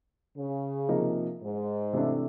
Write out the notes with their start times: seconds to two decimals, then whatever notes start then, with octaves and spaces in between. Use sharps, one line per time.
0.37 C#3
0.89 C3 F3 A#3 D#4
1.42 G#2
1.93 C3 E3 A3 D4